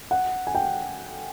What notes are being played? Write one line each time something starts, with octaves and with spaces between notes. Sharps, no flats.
F#5
G#5
G5